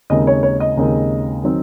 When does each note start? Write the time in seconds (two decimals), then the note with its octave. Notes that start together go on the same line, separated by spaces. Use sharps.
0.10 D#2 C#3 G#3 C4 D#4 D#5
0.27 C#5
0.43 C#5
0.60 D#5
0.77 D#2 C#3 G#3 C4 D#4
1.44 D#3 F#3 C4